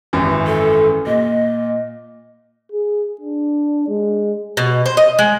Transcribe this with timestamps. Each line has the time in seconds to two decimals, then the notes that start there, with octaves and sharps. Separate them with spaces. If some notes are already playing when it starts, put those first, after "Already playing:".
0.13 G#1 F#2 E3
0.47 A4
1.07 A#2 D#5
2.72 G#4
3.21 D4
3.88 G#3
4.57 B2
4.86 C5
4.97 D#5
5.19 G#3